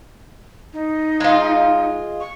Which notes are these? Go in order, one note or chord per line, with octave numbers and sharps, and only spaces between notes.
D#4
G#3 F4
C#6